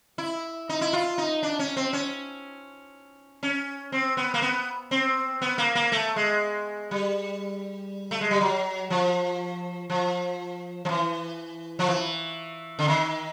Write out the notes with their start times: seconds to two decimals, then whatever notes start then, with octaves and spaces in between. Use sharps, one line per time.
0.18 E4
0.69 D#4
0.81 E4
0.93 F4
1.18 D#4
1.43 D4
1.59 C#4
1.77 C4
1.93 C#4
3.43 C#4
3.92 C4
4.17 B3
4.34 A#3
4.42 B3
4.91 C4
5.42 B3
5.58 A#3
5.75 A#3
5.92 A3
6.16 G#3
6.91 G3
8.11 A3
8.21 G#3
8.31 G3
8.41 F#3
8.90 F3
9.90 F3
10.85 F3
10.89 E3
11.79 F3
11.88 E3
12.79 D3
12.88 D#3